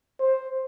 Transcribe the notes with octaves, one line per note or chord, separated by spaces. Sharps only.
C5